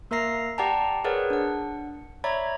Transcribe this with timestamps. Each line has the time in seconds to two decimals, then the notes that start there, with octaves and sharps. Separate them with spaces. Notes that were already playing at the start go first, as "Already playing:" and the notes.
0.11 A#3 A#4 E5 A#5 A#6 C7
0.58 G4 D5 F#5 G5 A5 A#5
1.04 G#4 A#4 B4 C#5 D5 F#5
1.30 D4 F#5
2.24 C#5 D5 E5 A#5 B5 G#6